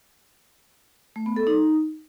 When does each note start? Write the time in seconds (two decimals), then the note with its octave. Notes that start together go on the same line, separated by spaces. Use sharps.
1.16 A3
1.26 B3
1.36 A4
1.47 D#4